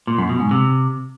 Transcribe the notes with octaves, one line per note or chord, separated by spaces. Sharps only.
A#2
F#2
B2
G#2
C3